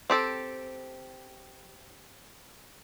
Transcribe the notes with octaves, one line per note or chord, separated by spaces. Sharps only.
C4 G4 A4